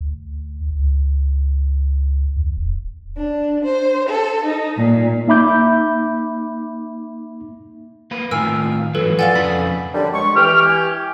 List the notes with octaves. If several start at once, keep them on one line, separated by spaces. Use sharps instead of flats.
D2
C#2
E2
D1
D4
C5
A4
D#4
A#2
A#3 D#4 E5 B5 D6 G6
A#3 B4
A2 D#3 F4 A#4 G#5 E6
G#2 E3 F#3 A4 B4
F3 A4 D5 F5 F#5 G#5
F2 C#3 B5 B6
F#2 D3 G3 D4
G#3 C#6
E3 G4 F6
G#5